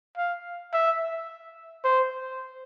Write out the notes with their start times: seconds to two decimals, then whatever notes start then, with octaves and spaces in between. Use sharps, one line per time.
0.17 F5
0.73 E5
1.84 C5